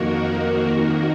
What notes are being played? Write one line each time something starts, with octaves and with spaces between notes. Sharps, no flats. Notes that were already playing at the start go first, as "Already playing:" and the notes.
Already playing: F2 D#3 A#3 F#4 A#4
F#4 A#4